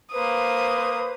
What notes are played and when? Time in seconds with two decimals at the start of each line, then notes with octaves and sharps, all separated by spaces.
0.12 A#3 B4 C5 D#6